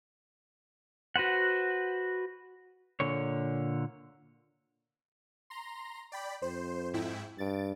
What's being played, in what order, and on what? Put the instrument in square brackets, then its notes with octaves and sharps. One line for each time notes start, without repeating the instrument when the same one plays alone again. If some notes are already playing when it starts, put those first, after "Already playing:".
[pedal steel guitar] F#4 B4 C5 F#5
[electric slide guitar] A#2 D3 C#5
[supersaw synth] A#5 C6
D5 G5 B5
[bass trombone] F2 [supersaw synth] C5
[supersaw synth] G#2 E4 G5
[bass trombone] G2 [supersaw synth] A6 D7